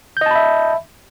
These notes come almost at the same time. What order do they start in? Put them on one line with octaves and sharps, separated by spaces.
G6 D#5 A5 B5 E5